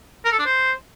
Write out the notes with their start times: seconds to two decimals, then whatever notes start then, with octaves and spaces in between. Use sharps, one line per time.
0.25 A#4
0.32 A4
0.39 D4
0.46 C5